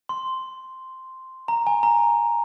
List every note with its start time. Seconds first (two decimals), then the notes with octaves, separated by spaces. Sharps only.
0.09 C6
1.48 A#5
1.67 G#5
1.83 A#5